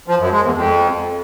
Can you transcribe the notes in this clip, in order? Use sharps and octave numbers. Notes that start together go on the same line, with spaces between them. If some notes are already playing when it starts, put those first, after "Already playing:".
F3
F#2
G#3
E2
F2